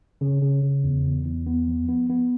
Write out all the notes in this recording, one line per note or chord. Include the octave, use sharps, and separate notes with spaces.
C#3
C#3
C#3
E2
E2
E2
B3
F3
B3
B3